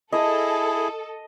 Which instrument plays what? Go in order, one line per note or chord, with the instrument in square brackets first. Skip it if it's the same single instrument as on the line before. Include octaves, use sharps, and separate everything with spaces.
[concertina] E4 G#4 [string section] A4 [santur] D#5